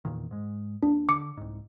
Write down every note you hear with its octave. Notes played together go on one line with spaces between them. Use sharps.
E2 A#2 D#3
G#2 G#3
D#2 D4
D3 D6 C#7
C2 G#2